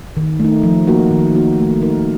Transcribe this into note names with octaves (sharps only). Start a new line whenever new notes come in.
D#3
A3 D#4
F3
A#3 D#4 F#4 A#4
D#3
A#3 D#4 F#4
A3
D#4 A#4